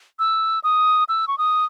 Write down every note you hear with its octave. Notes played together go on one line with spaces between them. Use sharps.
E6
D#6
E6
C#6
D#6